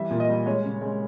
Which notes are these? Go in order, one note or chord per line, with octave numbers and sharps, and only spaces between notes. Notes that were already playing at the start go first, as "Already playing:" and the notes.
Already playing: E3 G3 E5
A#2
D#5
G3
G#3 C#5
C#3
G#3